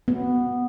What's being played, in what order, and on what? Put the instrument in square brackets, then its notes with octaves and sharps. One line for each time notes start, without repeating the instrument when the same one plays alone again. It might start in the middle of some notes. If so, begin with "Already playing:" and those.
[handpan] B3